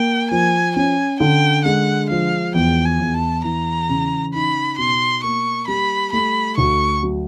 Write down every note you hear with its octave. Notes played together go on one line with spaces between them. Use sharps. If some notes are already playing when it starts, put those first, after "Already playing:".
Already playing: A#3 G5
F3 G#5
C#4 G#5
D3 G5
G#3 F#5
F3 F5
E2 G5
G#5
E2
A5
E3 A#5
C#3
D#4 B5
B2 C6
A#3 C#6
G3 B5
A3 B5
D2 C#6
F#3